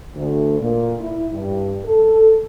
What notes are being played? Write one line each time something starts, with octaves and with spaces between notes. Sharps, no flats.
D2
A#2
E4
G2
A4